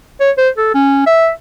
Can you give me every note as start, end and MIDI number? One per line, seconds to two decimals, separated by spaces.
0.20 0.31 73
0.38 0.49 72
0.57 0.71 69
0.74 1.02 61
1.06 1.30 76